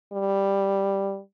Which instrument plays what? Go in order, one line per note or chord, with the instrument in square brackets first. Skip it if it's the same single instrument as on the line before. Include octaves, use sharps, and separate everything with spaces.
[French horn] G3